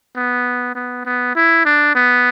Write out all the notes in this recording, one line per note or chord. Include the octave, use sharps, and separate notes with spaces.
B3
B3
B3
E4
D4
B3